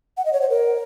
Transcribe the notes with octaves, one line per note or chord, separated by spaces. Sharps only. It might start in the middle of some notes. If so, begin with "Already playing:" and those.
F#5
D#5
C#5
C5
A#4